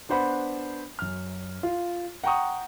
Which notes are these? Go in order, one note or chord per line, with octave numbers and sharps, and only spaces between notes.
B3 D4 C5 F#5 B5
F#2 F6
F4
F#5 G5 A#5 C#6 D#6